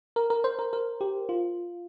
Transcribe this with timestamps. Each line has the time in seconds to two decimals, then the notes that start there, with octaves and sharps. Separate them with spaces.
0.16 A#4
0.30 A#4
0.44 C5
0.59 A#4
0.73 A#4
1.01 G4
1.29 F4